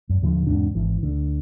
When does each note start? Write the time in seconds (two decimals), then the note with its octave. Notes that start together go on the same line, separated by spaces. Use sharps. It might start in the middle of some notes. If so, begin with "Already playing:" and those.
0.09 F#2
0.22 D#2 A2 D3 F3
0.47 E2 G#2 C3 D4
0.75 G#1 E3
1.03 D2 D3